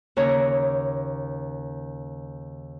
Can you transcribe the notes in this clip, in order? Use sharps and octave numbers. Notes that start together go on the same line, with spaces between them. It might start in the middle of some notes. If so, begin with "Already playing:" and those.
D#2 C#3 C#5 A#5